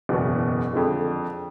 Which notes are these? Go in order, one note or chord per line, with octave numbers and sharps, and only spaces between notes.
F#1 E2 B2
F2 D3 F3 G#3